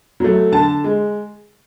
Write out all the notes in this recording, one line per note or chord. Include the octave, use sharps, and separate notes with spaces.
F#3 A3
D3 A5
G#3